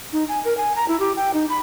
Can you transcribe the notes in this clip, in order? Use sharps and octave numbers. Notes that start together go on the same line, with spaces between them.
D#4
G#5
A#4
G#5
A#5
E4
G4
G5
D#4
B5